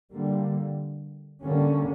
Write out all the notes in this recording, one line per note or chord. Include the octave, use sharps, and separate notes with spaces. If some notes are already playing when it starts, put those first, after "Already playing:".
D3 G3 A#3
D3 G3 A#3 C#4